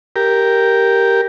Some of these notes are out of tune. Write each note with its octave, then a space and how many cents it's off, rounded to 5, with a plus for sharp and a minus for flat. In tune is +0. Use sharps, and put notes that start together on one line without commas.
G4 +0 A#4 +0